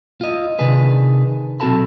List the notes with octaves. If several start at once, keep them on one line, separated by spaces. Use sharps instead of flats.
F4 D#5
C3 D#3 D4 G#4 B4
B1 C4 F#4 A4 A5 B5